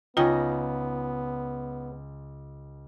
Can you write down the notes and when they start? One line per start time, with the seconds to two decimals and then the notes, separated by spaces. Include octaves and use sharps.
0.17 C#2 B3 C#4 D#4 F4 G5 D#6 A#6